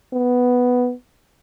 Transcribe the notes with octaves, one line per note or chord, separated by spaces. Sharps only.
B3